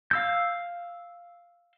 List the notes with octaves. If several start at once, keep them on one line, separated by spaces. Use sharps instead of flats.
F5 E6 G6